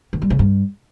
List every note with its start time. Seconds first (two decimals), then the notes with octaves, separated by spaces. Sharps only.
0.13 D#3
0.22 G3
0.30 C#3
0.39 G2